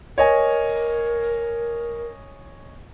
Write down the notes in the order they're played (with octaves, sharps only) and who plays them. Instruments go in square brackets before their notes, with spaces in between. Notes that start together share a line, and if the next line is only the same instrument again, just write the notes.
[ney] A#4 [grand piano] C#5 D#5 G#5